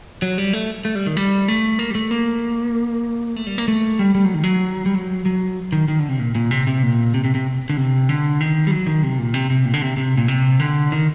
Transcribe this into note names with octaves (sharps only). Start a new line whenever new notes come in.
F#3
G3
A3
A3
G3
D#3
G3
A3
A#3
G3
A3
A#3
A3
G3
A#3
A3
G3
G3
F#3
D#3
F#3
G3
F#3
F#3
D#3
D#3
D3
C3
A#2
A#2
C3
C3
A#2
C3
C3
C3
D3
C3
D3
D#3
G3
F#3
D#3
C3
A#2
C3
C3
A#2
D3
C3
C3
A#2
C3
D3
D#3